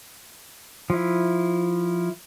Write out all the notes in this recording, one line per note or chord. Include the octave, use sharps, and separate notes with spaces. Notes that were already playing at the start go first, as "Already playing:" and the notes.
F3 E4